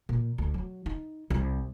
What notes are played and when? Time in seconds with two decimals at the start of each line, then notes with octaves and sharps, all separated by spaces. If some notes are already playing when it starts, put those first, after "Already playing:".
0.09 A#2
0.38 D2
0.54 F#3
0.86 D#4
1.30 C2